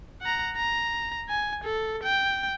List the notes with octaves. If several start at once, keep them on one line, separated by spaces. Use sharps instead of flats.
F#5 A#5
A#5
G#5
A4
G5